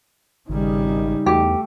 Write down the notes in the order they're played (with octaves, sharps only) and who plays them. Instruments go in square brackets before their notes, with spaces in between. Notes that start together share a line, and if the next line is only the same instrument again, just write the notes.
[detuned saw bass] G#1 [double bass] C#3 G3 [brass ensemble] D#4
[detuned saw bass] E2 [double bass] A3 [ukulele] G4